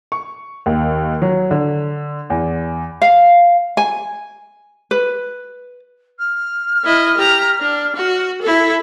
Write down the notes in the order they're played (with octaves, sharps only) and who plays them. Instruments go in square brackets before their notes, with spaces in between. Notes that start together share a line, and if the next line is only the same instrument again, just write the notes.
[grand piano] C#6
D#2
F#3
D3
E2
[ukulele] F5
G#5
B4
[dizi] F6
[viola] E4 D#5
G4 A#5
D4
F#4
E4 A4